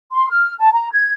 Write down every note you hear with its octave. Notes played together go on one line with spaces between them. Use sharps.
C6
F6
A5
A#5
G#6